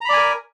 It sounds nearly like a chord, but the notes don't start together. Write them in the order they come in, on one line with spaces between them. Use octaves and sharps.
A#5 B5 D5 G#5 A#4